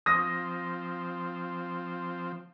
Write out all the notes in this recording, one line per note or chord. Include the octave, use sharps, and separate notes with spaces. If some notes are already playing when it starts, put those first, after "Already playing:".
F3 C4 D#6 A#6